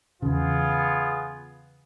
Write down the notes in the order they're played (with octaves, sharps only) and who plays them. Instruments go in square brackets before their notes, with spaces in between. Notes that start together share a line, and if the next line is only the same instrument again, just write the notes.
[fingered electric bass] E2 C#3 [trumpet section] B3 F4 G#4